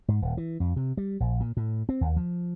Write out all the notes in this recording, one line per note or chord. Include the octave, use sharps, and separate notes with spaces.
G#2
D#1
E3
F2
C3
G3
A#1
A#2
A2
C4
D#2
F3